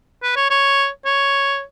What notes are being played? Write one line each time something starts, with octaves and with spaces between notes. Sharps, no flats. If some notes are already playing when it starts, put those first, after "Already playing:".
B4
C#5
C#5
C#5